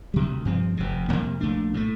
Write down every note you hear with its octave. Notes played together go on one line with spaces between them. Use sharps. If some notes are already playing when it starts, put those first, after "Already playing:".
D2 C3 G3
G2 F3 C4
F1 F2 C3
F2 C3 G3 A#3
A#1 A#2 A3 D4
A2 F3 A3